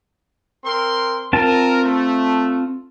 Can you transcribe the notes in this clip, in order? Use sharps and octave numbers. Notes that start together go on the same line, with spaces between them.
C4 A#4 C6
C4 F4 A#4 A5
A3